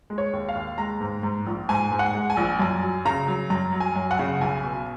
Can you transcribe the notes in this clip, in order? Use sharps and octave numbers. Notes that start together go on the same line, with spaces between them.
G#3
C#5
D#2
F5
D#2
G#3 A#5
G#2
G#2
A#1
G#2 G#5
G#2
F#5
G#3
G#5
A#1
F#2 G#5
F#3
C#3 A#5
F#3
F#2 A#5
F#3
G#5
F#2
F#5
C#3
B1 G#5
B2